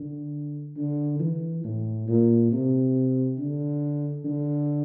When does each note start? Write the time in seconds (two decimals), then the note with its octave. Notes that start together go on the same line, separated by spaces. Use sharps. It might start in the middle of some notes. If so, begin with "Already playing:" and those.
Already playing: D3
0.77 D3
1.20 E3
1.64 A2
2.08 A#2
2.51 C3
3.39 D3
4.25 D3